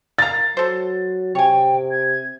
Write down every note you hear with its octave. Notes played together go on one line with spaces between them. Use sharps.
A#3 A#5 A6
F#3 A4 C5
C3 C#5 G5 G#5
G#6